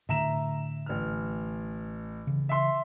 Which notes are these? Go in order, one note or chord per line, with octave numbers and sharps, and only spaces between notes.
A2 D3 A3 E5 A#5 E7
A1 F6
C#3 E3
E5 C6